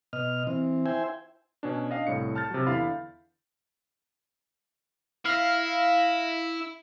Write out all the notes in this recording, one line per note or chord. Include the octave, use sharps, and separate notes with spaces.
B2 D#5 F6
E3 C4
E4 C5 E5 G5 G#5
B2 C#4 D4
D4 D#5 F5 G5
C2 A2 C#5 C#7
A5 F6 G6 A6
C3 F#3
E2 D3 E4 F5 B5
E4 F5 A#6